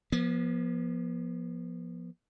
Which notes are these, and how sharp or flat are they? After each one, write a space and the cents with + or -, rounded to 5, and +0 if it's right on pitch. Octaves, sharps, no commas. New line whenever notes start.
F3 +0 B3 -40